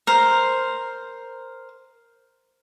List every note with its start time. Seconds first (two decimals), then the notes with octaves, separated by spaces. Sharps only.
0.07 A#4 C5